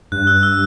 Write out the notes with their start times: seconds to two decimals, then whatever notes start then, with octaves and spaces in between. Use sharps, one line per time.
0.12 G2 F#6
0.27 E6
0.43 E6